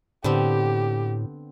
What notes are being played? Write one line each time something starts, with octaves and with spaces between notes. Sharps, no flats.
A2 D3 B3 C4 G4